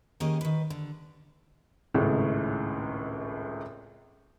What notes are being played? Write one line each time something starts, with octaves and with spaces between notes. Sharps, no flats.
D#3 A#3 C#4 G4 G#4 D#5
D#3 B4
D3
G#1 C#2 A2 C#3 G#3